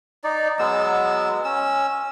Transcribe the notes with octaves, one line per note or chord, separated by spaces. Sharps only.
D#4 D5
F#3 G#3 B3 E6
C#4 E6